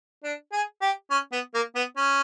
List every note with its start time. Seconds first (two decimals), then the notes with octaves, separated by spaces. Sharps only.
0.24 D4
0.52 G#4
0.81 G4
1.10 C#4
1.32 B3
1.54 A#3
1.75 B3
1.97 C#4